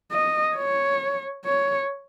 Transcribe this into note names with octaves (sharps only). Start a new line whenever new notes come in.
D#5
C#5
C#5